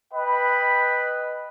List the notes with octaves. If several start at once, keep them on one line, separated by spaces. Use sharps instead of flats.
B4 D#5 G5 B5